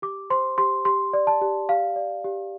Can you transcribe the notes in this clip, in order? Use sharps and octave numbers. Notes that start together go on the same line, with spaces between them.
G4 D6
C5 C6
G4 C6
G4 C6
D5
A5
G4
G4 F5
D5
G4